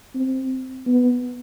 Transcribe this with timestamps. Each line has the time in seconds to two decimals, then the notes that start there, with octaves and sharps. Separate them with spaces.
0.15 C4
0.87 B3